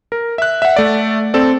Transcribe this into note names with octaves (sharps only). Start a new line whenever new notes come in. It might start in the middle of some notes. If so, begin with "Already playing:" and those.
A#4
E5 F#6
E5 F#5
A3 D5
C4 A4 D5